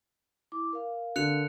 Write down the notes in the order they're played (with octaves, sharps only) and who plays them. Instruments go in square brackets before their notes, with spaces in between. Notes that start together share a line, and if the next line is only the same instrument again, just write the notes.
[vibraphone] E4 D6
A#4 F5
[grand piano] D3 [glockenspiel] F#6 C#7 F7